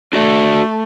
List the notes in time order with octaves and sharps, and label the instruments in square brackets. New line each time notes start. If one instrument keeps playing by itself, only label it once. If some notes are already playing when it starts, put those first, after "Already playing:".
[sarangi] A3 [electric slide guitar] D4 F#4 D5